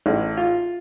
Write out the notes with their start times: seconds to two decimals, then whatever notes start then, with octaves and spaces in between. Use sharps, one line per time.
0.06 A1
0.37 F4